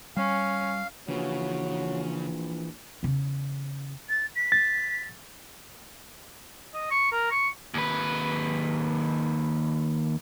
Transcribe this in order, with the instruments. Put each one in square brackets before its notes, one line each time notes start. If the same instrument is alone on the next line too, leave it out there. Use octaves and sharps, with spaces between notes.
[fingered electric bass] G3 [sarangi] C#4 [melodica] F5
[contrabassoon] A#1 [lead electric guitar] C#3 [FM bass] E3 [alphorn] F#3
[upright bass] E2 C#3
[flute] A6
B6
[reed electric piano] A6
[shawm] D#5
C#6
A#4
C#6
[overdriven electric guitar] D#2 B4